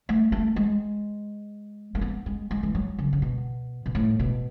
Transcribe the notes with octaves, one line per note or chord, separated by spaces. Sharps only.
A3
A3
G#3
A3
B3
G#3
G#3
E3
F#3
C#3
C#3
B2
B2
A2
B2